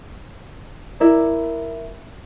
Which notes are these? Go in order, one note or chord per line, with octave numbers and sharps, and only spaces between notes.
E4 A#4 D5